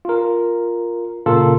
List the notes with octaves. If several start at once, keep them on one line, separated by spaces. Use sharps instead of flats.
F4 A#4
A#2 C#3 F4 A4 A#4